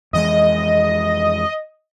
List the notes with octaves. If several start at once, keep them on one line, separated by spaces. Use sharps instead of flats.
F2 E3 G#3 D#5